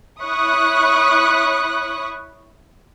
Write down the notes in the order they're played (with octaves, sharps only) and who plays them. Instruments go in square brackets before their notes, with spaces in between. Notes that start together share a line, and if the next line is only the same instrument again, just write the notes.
[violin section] E4 C#5 B5 C#6 D#6 F#6